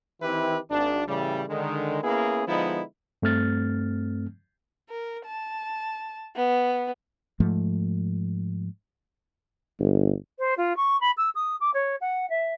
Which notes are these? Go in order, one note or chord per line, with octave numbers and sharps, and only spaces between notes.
D#3 E3 C4 E4 G4 B4
G#1 D4
A2 C#3 E3 G3
D3 D#3 G#3
A#3 B3 C#4 E4 G#4
D3 F3 G#3 B3 D#4 E4
G2 A3 C4 F6 A6
A#4
A5
B3
G#2 F3 A3
G1
C5
F4
C#6
B5
E6
D#6
D6
C#5
F#5
E5